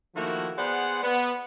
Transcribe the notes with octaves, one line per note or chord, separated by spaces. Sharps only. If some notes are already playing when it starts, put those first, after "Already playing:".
D#3 F3 A3 A#3 E4 F#4
B3 G#4 C5 D5 F#5
B3